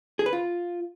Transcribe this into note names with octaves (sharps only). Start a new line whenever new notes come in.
G#4
B4
F4